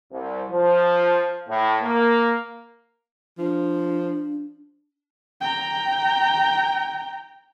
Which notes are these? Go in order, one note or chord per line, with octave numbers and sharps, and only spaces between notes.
C2
F3
A2
A#3
F3 D4
G5 A#5